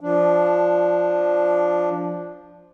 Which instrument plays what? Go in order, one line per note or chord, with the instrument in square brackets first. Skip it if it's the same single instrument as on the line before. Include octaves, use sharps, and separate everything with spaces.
[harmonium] F3 D4